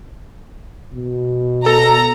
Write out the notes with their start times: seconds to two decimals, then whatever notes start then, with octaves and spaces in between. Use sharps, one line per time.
0.93 B2
1.66 A4 A#5